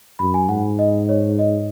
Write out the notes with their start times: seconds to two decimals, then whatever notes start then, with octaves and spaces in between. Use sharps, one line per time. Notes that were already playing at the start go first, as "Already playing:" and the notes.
0.19 F#2 B5
0.34 G#5
0.49 G#2 F#5
0.79 D#5
1.09 C#5
1.39 D#5